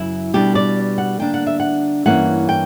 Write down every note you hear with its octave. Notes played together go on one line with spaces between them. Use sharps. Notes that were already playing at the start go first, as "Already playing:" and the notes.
Already playing: F#2 C#3 F#3 E4
B2 G3 B3 D4 G4
D5
F#5
D3 G3 A#3 D4 G5
F#5
E5
F#5
G2 E3 A#3 C#4 F#5
G5